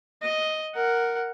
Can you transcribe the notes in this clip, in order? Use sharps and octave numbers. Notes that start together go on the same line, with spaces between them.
D#5
A#4 F#5